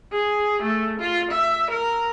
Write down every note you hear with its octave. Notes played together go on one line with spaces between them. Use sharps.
G#4
A3
F4
E5
A#4